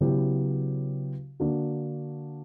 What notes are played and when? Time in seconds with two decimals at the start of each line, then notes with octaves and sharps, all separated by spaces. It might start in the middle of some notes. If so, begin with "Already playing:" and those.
0.01 C#3 F#3 B3 E4 G4
1.40 D3 A#3 D4 F#4